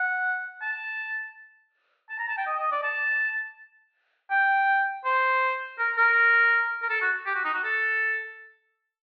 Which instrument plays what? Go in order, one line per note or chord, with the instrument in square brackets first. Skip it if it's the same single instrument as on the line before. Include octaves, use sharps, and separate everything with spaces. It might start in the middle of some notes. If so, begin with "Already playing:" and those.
Already playing: [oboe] F#5
A5
A5
A#5
A5
G5
D#5
D#5
D5
A5
G5
C5
A#4
A#4
A#4
A4
F#4
G4
F#4
D#4
F#4
A4